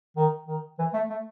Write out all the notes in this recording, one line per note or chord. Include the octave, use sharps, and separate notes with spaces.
D#3
D#3
E3
A3
A3